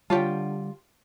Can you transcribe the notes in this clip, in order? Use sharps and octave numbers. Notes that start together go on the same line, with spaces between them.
D3 G3 F4 G4 C#5 G5 A5